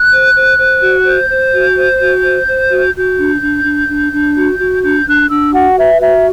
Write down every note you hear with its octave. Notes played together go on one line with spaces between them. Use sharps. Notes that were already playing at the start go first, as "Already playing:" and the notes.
Already playing: F#6
C5
C5
C5
F#4
C5 G6
C5
F#4
C5
F#4
C5
C5
F#4
F#4 G6
D4
D4
D4
D4
D4
F#4
F#4
D4 G6
D4 F#6
D4 E6
F#4 F#5
B4 E5
F#4 E5